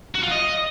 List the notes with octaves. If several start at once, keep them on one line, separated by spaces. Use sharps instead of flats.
F#4
F4
D#5